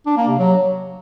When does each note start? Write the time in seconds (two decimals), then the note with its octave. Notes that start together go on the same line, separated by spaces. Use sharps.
0.06 D4
0.17 A#3
0.28 C3
0.38 F#3